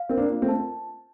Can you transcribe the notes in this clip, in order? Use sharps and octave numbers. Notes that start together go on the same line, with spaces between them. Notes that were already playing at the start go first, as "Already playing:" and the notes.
Already playing: F5
C4 A#4
A#3 D4
F4
A3 C4
A5